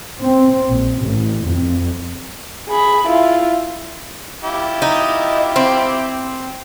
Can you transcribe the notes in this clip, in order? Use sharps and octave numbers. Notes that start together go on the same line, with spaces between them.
C4
A#1
A1
F2
G#4 B5
E4 F4
E4 F4 G4
D#4
C4